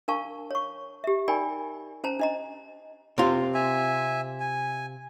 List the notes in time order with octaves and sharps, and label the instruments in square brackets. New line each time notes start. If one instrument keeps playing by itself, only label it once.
[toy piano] D4 A#4 F5 A5 C#6
C#5 C#6
G4 E5
D#4 A#4 D5 G5 G#5 B5
C#4 C5 A5 A#5
D4 D#5 A#5
[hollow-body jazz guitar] C3 F4
[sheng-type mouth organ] E5 G#5
G#5